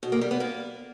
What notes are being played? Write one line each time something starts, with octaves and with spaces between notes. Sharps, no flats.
B2
A#3
G3
B3
A#3